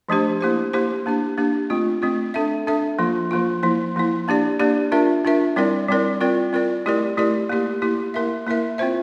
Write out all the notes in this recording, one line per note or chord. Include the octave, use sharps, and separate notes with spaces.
F3 A3 D4 G4 C5
A#3 E4 G4 C5
A#3 E4 G4 C5
A#3 D4 G4
A#3 D4 G4
A3 C4 F4
A3 C4 F4
D4 A4 E5
D4 A4 E5
F3 A#3 F4
F3 A#3 F4
F3 A#3 E4
F3 A#3 E4
A#3 D4 G4 D5
A#3 D4 G4 D5
D4 F4 A#4 E5
D4 F4 A#4 E5
G3 C4 E4 A#4 D5
G3 C4 E4 A#4 D5
C4 F4 A#4 D5
C4 F4 A#4 D5
A3 E4 G4 A#4 D5
A3 E4 G4 A#4 D5
A#3 E4 G4
A#3 E4 G4
A#3 E4 A#4 E5
A#3 E4 A#4 E5
C4 F4 C5 E5